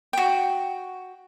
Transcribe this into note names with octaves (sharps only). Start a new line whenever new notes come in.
F#4 G5